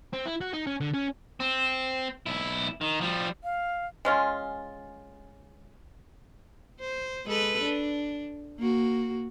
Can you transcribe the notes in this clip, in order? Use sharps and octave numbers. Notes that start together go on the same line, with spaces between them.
C4
E4
F#4
D#4
C#4
D3
C#4
C4
B1 E4
D#3
F3 G3
F5
G#3 C#4 F4
C5
G#3 A4 B4
D4
A#3 F#4